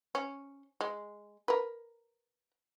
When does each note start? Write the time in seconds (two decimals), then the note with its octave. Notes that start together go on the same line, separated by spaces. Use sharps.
0.15 C#4
0.81 G#3
1.48 A#4 B4